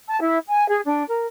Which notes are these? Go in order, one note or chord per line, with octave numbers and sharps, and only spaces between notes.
A5
E4
G#5
G#4
D4
A#4